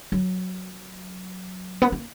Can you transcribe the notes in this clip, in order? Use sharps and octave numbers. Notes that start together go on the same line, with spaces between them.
F#3
B3
A#3